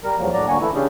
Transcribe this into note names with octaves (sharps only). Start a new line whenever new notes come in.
G3 A#4
E2 G2 F3 F#3 A#3
A2 F#3 D4 D5 A#5
D2 D3 A#3 F#4 G#5 C#6
E3 A3 E4
C#3 C#4 D4 G4 G#4